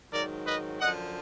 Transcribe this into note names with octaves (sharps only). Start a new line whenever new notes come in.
G#2 D#3 F#3 A#4 D5
B4 D#5
F#2 D3 F3 D#5 F#5